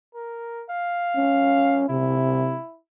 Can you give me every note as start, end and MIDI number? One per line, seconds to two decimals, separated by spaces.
0.14 0.64 70
0.69 1.84 77
1.16 1.87 61
1.89 2.58 48
1.89 2.78 64